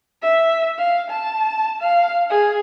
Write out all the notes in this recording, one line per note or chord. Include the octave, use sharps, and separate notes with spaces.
E5
F5
A5
F5
G#4